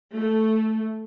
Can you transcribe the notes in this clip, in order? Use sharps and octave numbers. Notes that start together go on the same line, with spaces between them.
A3